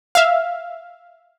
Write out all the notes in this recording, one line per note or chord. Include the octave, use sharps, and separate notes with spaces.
E5 F5